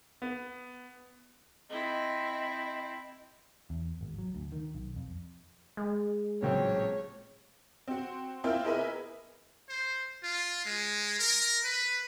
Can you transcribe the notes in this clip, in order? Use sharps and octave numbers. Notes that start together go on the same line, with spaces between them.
B3
C4 E4 D#5
E2
G#1
F#3
D2
D#3
B1
F2
G#3
A1 A#2 C#3 F#3 C4 C#5 G5
C4 F#4
A#3 C4 E4 F4 G5
E4 G#4 A#4 B4 D#5 E5
C5
F4
G#3
A#4
B4